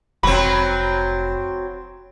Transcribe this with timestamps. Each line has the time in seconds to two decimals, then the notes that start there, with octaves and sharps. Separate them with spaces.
0.23 F1 F#3 C4 B5